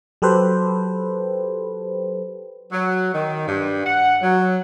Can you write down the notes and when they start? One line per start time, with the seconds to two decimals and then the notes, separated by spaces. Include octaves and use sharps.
0.22 F#3 G4 A4 B4 C5
2.72 F#3
3.14 D#3
3.48 G2
3.85 F#5
4.22 F#3